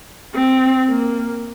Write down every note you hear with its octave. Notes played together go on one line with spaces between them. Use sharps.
C4
A#3